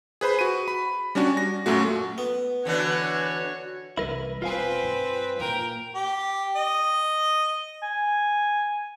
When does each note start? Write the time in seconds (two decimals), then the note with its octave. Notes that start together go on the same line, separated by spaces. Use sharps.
0.21 G#4 B4 C5 B5
0.39 F#4 D#7
0.68 B5
1.15 G3 C#4 D4 F#4
1.37 A#6
1.66 F#2 A#2 A3 F#4
2.18 B3
2.65 D3 E3 D4 F#4 C#5
3.97 C2 E3 E4 A#4 B4
4.42 E1 C4 F4 B4 F5 G#5
4.83 G2
5.40 A#1 E4 A#4 G5
5.95 G4
6.56 D#5
7.83 G#5